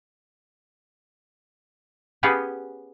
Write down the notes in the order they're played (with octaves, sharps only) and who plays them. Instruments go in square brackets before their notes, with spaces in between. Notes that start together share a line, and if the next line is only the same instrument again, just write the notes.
[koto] B3 C#4 G4 G#4 B4